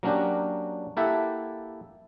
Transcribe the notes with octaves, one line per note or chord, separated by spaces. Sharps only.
F#3 A#3 C#4 D4 F#4 G4
A#3 E4 G4 A4 E5 F#5